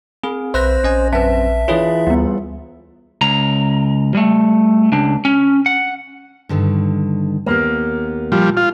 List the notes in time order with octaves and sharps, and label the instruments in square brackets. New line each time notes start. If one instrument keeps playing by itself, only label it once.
[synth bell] C4 [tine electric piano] G#4
[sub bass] B1 [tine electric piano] B4 E5 [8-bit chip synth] C5 [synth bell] C6 F#6 A#6
[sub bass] A#1 [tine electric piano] C#4 D#5 G#5
[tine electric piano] F#2 C4 [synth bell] B4 A5 [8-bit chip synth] E5
[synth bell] E3 E4 C#5 [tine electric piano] F4 G#4 B4
[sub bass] D2 [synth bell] G3 B3
[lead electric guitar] C#2 A#5
G3 A3
C#2 D4
C#4
F#5
[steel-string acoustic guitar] G2 D3 D#3
[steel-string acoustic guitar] D#2 B3 G4 [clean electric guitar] A#3
[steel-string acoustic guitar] A#2 [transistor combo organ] F3 G3
[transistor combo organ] F4